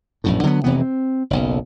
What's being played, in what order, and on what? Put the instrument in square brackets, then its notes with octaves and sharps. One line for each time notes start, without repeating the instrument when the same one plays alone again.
[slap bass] A#1 F#2 A2
D3 F#3 A#3 B3
F1 C3 E3 B3
C4
F#1 B1